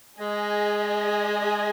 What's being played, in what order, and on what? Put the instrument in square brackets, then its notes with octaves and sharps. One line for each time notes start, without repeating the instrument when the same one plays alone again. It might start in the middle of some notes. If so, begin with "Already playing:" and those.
[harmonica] G#3 [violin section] G#4 D#5 G#5